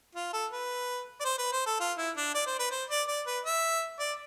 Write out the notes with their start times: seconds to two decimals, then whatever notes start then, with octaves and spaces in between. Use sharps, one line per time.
0.15 F4
0.33 A4
0.52 B4
1.20 D5
1.24 C5
1.38 B4
1.52 C5
1.66 A4
1.80 F4
1.98 E4
2.17 D4
2.34 D5
2.47 C5
2.59 B4
2.71 C5
2.90 D5
3.08 D5
3.26 B4
3.45 E5
3.99 D5